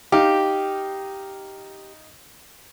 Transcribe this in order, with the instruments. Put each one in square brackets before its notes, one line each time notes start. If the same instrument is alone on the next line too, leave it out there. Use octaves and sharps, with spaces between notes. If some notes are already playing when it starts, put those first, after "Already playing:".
[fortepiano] D#4 F5 [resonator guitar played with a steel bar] G4